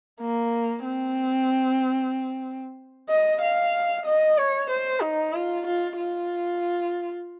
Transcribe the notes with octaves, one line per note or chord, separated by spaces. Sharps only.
A#3
C4
D#5
F5
D#5
C#5
C5
D#4
F4
F4
F4